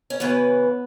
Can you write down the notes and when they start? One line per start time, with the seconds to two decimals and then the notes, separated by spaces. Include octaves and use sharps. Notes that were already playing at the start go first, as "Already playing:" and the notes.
0.10 C#4
0.20 F#2 C#3 E3 B3